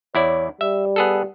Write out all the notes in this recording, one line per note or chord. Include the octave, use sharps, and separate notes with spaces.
E2 E4 C#5 D5
G3 E5
B3 G#4 A4